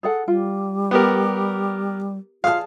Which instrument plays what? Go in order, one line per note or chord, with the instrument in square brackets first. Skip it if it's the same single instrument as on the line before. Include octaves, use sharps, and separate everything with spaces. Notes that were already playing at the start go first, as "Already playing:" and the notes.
[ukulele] G#4 A4 F#5
[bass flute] G3 [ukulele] F4
[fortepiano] B3 G4 A#4
[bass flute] F4 [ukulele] G#4 A5 [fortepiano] F5 F6